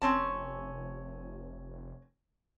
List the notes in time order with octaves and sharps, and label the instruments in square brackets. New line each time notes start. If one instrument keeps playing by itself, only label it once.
[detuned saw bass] F1 [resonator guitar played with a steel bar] C4 C#4 A5